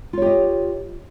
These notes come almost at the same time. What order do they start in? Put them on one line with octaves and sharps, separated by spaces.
F4 C#5 G4 D#5